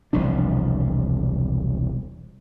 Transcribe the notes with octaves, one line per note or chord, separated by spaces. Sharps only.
E1 C2 F3 D4